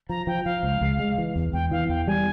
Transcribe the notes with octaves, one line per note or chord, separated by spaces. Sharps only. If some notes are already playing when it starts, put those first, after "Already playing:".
F3 A#5
F3 G5
F3 F5
C#2
C#2
G#3
E3
E2
E2 G5
E3 F5
E2 G5
G3 G#5